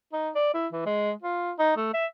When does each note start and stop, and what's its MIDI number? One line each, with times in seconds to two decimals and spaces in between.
0.13 0.30 63
0.35 0.50 74
0.54 0.67 64
0.73 0.83 52
0.86 1.11 56
1.22 1.51 65
1.59 1.72 63
1.77 1.90 57
1.94 2.06 76